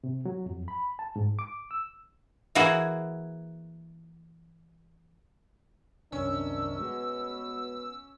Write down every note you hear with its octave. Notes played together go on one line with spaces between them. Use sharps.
C3
F#3
F2
B5
A5
G#2
D6
E6
E3 A#3 F#4 G#4
C2 F#2 C3 D#3 C#4 D4 E6
B2 G#3 B3 F#4